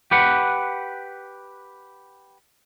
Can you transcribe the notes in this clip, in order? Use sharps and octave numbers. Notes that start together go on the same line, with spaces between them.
G4 B4 F#5